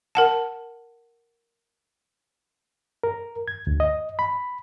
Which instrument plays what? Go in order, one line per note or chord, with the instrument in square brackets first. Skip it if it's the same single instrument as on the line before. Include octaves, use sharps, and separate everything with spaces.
[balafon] A#4 F#5 A5
[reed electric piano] A#4
G#6
D2
D#5
B5